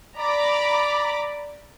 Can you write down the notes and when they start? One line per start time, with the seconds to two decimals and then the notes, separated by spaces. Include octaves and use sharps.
0.17 D5 A#5 B5 D6